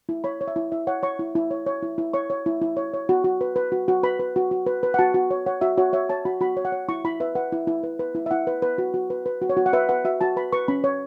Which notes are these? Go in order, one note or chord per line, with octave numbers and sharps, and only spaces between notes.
E4
C#5 B5
C#5
E5
E4
E4 E5
C#5 F#5
C#5 C#6
E4
E4
C#5
C#5
E4
E4
C#5 C#6
C#5
E4
E4
C#5
C#5
F#4
F#4
B4
B4
F#4
F#4
B4 B5
B4
F#4
F#4
B4
B4
F#5
F#4 A5
F#4
C#5
C#5 F#5
F#4 E5
F#4 C#5
C#5 E5
C#5 A5
F#4 B5
F#4 B5
C#5
F#5
C#5
E4 C#6
E4 B5
B4 E5
B4 F#5
E4
E4
B4
B4
E4
E5
E4 F#5
B4
B4
F#4
F#4
B4
B4
F#4
C#5
F#4
F#5
B4 E5
B4 F#5
F#4 E5
F#4 A5
B4 B5
B4 C#6
C#4 B5
C#5